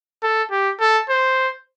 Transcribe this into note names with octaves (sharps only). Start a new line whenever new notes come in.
A4
G4
A4
C5